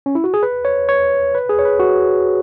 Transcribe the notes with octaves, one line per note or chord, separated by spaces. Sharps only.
C#4
E4
F#4
G#4
B4
C#5
C#5
B4
G#4
C#5
B4
F#4